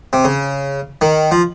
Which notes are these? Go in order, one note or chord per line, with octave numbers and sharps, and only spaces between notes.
C3
C#3
D#3
F3